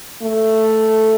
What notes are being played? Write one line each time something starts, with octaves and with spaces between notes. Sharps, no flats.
A3